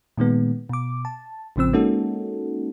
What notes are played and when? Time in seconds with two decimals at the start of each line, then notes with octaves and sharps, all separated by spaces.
0.17 A#2 D#3 G#3 B3
0.69 B2 D6
1.05 A5
1.56 A1 C#3 F3 C4 E6
1.73 G#3 A#3 C#4 D#4 F#4 A4